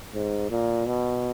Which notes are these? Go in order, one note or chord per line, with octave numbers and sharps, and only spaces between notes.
G#2
A#2
B2